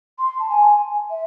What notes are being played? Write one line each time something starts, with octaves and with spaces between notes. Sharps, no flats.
C6
A5
G#5
E5